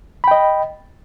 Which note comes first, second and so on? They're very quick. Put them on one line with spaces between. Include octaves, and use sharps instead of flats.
B5 G5 D#5